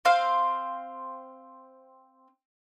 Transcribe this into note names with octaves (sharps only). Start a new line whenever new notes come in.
C4 C5 F5